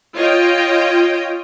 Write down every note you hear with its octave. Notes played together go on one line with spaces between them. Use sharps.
F4 C#5 D#5 G5